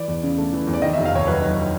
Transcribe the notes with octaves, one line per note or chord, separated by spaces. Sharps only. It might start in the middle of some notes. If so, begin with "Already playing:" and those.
Already playing: E3 D5
E2
C#3
A3
E3
E2
D5
D#3 D#5
E5
F1
F5
D#2 C#5
F#3 B4
D#3